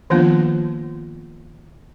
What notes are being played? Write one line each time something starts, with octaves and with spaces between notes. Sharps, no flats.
D#3 F3 A#3 B3 D4 F4